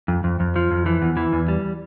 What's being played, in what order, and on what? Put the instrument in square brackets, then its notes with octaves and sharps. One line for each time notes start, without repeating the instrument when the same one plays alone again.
[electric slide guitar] F2
F2
F2
F3
F2
E3
E2
E3
E2
G3